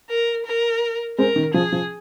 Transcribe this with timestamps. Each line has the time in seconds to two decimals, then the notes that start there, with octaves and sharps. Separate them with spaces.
0.09 A#4
0.46 A#4
1.18 G#3 C4 A#4
1.36 D#3
1.54 F3 G#4
1.72 F3